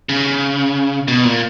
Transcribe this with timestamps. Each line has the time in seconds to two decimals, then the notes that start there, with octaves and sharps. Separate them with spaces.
0.09 C#3
1.08 B2
1.25 A#2